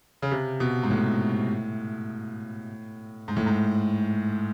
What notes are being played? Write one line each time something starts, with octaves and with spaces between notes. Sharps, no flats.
C#3
C3
B2
G#2
A2
G#2
A2
G#2